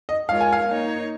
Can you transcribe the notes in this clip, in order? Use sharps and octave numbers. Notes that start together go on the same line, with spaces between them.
D#5
G#3 F4 A#4 C#5 F5
G#5
F5
A#3 D#4 C#5